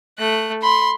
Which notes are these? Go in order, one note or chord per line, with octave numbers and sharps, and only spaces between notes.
A3 F#6
B5 C6